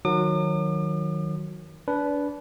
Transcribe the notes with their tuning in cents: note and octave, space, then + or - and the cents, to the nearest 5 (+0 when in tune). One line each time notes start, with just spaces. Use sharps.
D#3 +0 F#3 -20 D6 +45
D4 -25 B4 +0